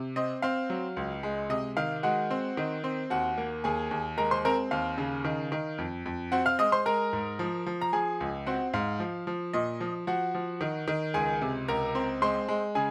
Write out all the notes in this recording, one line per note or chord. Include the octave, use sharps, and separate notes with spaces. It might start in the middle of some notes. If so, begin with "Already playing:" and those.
Already playing: C3
C4 D#5
C4 F5
F#3
C#2
G#3
C3 D#5
D#3 F5
G#3 F#4 F#5
C4
D#3
C4
D#2 F#4 F#5
A#3
D#2 G#4 G#5
D#2
G#3 A#4 A#5
C5 C6
C4 A#4 A#5
D#2 F5
C#3
D#3
D#3
F2
F2
C4 F#4 F#5
F5 F6
G#3 D#5 D#6
C5 C6
G#3 A#4 A#5
G#2
F3
F3
A#5
F3 G#4 G#5
C#2
C4 F#4 F#5
G#2 F5
F3
F3
A#2 D#5
F3
F3 F#4 F#5
F3
D#3
D#3
C#2 G#4 G#5
C3
C#2 A#4 A#5
C4
G#3 C5 C6
G#3
C#3 G#4 G#5